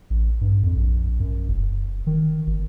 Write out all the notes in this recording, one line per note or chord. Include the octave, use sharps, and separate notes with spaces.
A1
G2
F2
A#1
F#2
F1
D#3
G1